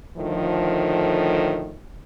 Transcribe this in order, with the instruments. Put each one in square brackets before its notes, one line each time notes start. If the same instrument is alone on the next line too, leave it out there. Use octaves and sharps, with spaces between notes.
[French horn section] A2 D3 D#3 F3